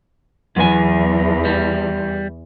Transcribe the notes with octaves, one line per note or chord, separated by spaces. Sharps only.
E2 F#3 G#5
G3